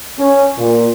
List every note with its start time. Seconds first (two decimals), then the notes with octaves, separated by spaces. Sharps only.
0.19 C#4
0.58 A#2